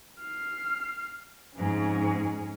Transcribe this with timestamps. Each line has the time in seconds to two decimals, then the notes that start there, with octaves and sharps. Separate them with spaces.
0.21 F6 C7
1.56 F2 G#2 C#4 G#4